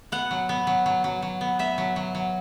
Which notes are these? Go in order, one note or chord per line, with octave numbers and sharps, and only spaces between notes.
B3 F#5
F#3
B3
F#3
F#3
F#3
F#3
B3
B3 E5
F#3
F#3
F#3